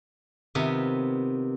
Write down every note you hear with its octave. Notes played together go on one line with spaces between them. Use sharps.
C3 D#3 B3 F4